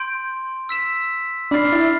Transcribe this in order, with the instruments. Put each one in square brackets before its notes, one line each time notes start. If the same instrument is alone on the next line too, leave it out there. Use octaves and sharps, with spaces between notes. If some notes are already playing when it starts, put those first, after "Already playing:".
Already playing: [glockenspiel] C6 G6 D7
E6 B6 E7
[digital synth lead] D4 [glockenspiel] B5 F6 A6 C7
[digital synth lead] E4